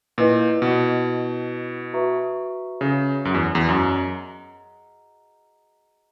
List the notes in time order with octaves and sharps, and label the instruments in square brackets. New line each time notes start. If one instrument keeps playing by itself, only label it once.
[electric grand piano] A#2 [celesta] E4 B4 D#5
[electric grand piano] B2
[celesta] F#4 B4 E5 A#5 C#6
[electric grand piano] C#3
F#2
E2
E2
[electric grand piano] F#2 [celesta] G#4 D#5 F#5 A#5